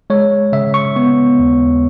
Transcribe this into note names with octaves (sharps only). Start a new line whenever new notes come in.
G#3 C#5
C#3 E5
C#6
B3
D#2